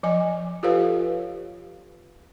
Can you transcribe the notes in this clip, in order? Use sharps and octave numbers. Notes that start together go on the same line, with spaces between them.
F3 D#5 G#5
F4 G4 A4 B4 C#5 F5